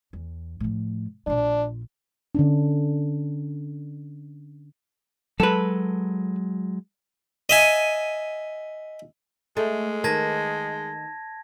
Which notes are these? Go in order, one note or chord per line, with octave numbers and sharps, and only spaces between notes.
E2
A2 F3
A#1 D4 F4
D3 C#4 D4
F#3 G#3 A4 B4
D#5 E5 G#5
G#3 A3
D#3 A#4 B4 A5 G#6 A#6